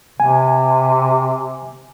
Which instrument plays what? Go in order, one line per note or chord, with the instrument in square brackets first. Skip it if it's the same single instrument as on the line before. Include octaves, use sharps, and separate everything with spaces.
[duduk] C3 [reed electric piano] G#5